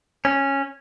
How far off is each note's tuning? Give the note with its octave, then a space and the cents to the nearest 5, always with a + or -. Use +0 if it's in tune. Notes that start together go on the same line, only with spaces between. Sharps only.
C#4 -10